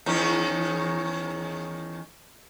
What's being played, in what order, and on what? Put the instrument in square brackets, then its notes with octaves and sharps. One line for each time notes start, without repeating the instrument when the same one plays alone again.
[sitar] E2 D#3 C#4